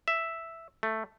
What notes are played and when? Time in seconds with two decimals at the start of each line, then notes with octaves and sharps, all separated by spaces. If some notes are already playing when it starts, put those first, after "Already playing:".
0.08 E5
0.83 A3